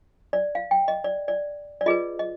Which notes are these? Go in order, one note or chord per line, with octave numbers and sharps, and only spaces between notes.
D5
F5
G5
D#5
D5
D5
D5
F4 G#4 B4 D#5
D#5